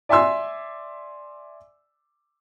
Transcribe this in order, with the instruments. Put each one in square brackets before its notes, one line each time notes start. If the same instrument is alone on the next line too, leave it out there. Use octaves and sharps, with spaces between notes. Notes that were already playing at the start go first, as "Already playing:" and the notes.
[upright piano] D5 E5 G#5 C6 E6